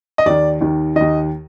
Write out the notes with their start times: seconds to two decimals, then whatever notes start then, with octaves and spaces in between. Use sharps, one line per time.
0.18 D#5
0.26 D#2 D#3 D5
0.61 D#2 D#3
0.96 D#2 D#3 D#5